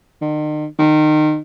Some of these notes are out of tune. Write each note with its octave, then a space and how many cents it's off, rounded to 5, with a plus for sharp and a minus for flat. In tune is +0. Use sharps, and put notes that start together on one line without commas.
D#3 -40
D#3 -25